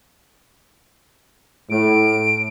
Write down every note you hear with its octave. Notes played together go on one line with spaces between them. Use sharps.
A2 D7